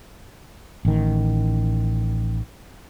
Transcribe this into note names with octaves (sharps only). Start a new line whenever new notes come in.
A1 D#3